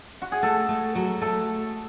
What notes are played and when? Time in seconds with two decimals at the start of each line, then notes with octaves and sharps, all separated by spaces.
0.22 F#4
0.32 G#4
0.43 A3 A4
0.69 A3
0.95 F#3
1.22 A3 A4